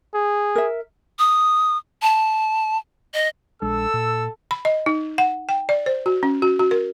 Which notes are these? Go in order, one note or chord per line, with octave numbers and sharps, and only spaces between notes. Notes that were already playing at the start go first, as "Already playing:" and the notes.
G#4
A#4 E5
D#6
A5
D#5
A#1 G#3 D4 A4 E6
A#2
B5
D#5
D#4
F#5
G5
D5
C5
F#4
C#4
F#4
F#4
A#4